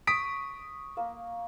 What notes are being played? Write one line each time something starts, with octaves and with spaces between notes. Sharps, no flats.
C#6 D#6 B6 D7
A#3